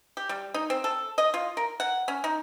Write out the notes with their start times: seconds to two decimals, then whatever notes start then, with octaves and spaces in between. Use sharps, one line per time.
0.17 G4
0.29 G3
0.54 D#4
0.70 C4
0.84 A4
1.18 D#5
1.34 F4
1.57 A#4
1.80 F#5
2.08 C#4
2.24 D#4